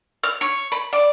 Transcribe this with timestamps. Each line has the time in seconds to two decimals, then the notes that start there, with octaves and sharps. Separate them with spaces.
0.24 F6
0.41 C#5
0.72 B5
0.93 D5